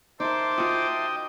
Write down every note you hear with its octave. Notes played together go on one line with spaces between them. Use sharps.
D#4 A#4 C5 E5 A5 C6 D6
F4 F#4 D#5 G5